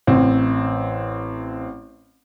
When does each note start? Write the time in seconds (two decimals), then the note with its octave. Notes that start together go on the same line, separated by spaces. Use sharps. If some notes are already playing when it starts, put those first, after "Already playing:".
0.07 A1 C4